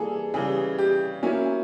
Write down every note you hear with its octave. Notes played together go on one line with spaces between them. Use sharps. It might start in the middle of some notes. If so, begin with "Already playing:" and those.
Already playing: E3 G3 A#3 G#4 A4
C#3 E3 G3 G#4
G4
F#3 A#3 C#4 E4